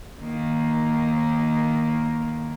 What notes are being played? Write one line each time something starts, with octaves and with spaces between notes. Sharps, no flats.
D#3 A#3